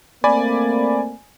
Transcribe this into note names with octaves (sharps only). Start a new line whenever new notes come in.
A3 A#3 C4 D5 G#5 B5